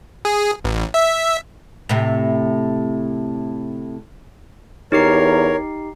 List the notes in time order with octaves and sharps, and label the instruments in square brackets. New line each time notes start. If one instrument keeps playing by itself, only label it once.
[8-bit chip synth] G#4
A1
E5
[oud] A2 C3
[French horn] E2 [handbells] D#4 G4 C7 [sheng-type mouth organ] A#4 C#5